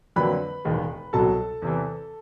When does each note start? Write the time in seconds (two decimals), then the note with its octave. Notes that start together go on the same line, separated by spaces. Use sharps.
0.16 F2 D3 F#3 A#3 B4 B5
0.65 E1 D#2 D#3 G#3
1.13 C2 B2 F#3 A4 A5
1.62 E2 C3 E3